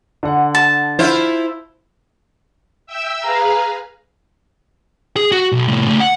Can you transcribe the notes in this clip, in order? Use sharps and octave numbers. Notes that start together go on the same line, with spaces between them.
D3 F#5
A5
E4 F4 C5
E5 G5 E6
G#4 B4 F5 A#5
G#4
F#4
B1
A2 C3
C#3 A3
F#5